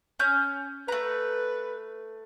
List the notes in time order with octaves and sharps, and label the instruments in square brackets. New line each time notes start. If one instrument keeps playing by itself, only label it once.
[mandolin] C#4 G6
[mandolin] A3 A#5 [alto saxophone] B4